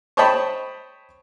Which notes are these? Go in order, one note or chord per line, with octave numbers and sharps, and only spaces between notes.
C5 C#5 D#5 G5 A5 B5